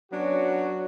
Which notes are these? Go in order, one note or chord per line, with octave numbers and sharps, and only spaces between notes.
F#3 B3 C#4 D4 F#4